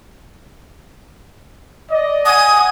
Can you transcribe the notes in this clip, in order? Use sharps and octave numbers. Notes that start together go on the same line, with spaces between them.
D5 D#5
F#5 G#5 D#6